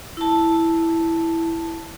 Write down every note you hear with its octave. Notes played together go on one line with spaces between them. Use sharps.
E4 A5